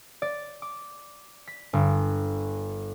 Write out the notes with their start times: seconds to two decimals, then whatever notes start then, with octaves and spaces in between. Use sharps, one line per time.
0.22 D5
0.62 D6
1.47 B6
1.73 G1